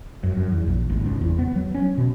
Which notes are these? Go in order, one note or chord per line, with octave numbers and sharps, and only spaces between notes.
F#2
F#2
E2
A#1
G#1
C#2
E2
B3
F#3
C#4
B2